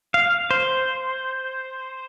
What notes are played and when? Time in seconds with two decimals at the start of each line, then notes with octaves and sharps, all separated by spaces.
0.14 F5
0.51 C5